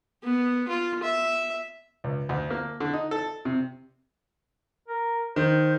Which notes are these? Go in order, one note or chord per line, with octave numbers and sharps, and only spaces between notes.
B3
F4
E5
C#2
D2
A#3
D3
D#4
A4
C3
A#4
D#3 C5